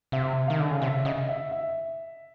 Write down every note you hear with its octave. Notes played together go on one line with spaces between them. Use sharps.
C3 E5
D#3 F5
D3
C#3
C3 E5
C#3 D#5
E5
E5